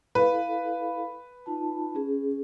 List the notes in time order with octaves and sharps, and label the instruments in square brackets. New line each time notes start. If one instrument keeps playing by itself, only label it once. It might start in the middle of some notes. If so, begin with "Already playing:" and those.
[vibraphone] E4 A4 F5 [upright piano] B4
[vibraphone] D#4 F4 A5
C#4 G#4